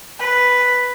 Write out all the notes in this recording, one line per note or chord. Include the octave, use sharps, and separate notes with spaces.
B4